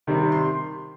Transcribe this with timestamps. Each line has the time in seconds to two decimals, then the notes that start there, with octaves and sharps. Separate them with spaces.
0.07 C3 D#3 G3 C4
0.32 C6